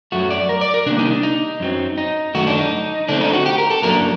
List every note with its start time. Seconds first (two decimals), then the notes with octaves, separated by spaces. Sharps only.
0.12 F#2 F#3 A3 F#4
0.31 D5
0.49 A#4
0.61 D5
0.74 A#4
0.86 C3 D#3 G3 A#3 D4
0.99 D#4
1.11 D4
1.23 D#4
1.60 F#2 F#3 C4
1.98 D#4
2.35 F#2 D#3 A3 F#4
2.47 D4
2.59 D#4
3.08 D3 A3 C4 D4
3.21 D#4
3.33 F#4
3.46 G4
3.58 A#4
3.70 A4
3.82 F#2 F#3 A#3 D4 A#4